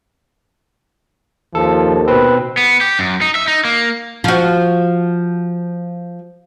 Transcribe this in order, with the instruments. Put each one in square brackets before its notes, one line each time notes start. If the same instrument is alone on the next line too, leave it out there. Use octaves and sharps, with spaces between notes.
[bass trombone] D#2 [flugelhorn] F3 [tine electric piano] A4
[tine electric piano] B2 C4 [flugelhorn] B4
[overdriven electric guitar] B3
G4
F#2
D#4
E5
D#4
A#3
[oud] F3 F#4